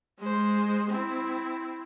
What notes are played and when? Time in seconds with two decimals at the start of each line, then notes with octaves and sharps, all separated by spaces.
0.19 G#3 C5
0.90 C4 E4